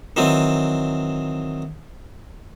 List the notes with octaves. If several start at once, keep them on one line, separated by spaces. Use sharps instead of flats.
D#3 E3 F#3 C4